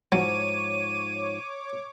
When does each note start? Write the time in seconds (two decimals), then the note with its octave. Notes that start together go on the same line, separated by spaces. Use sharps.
0.12 G#2 F3 F#3 C#5 D6 D#7